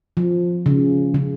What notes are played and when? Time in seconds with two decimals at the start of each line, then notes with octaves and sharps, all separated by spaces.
0.17 F3
0.66 C#3
1.14 C#3